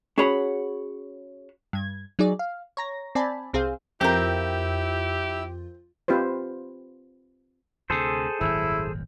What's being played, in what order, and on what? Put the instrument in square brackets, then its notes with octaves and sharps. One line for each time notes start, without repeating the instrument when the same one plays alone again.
[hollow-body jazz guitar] C#4 F#4 G#4 C#5 F#5 B5
[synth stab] G2 G#6
F#3 D#4 G#4 D5
F5
C#5 A#5 A#6
C4 D5 G#5 A5 B5
C2 C4 G#4 C5 F5
[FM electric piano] F2 F4 [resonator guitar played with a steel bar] C4 A#4 [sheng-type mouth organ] E4 E6 [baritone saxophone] G4
[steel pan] C4 F4 G4 B4 C5
[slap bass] D2 C3 [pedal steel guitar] G#4 A4 C5
[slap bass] D#1 G#1 F#2 [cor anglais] E4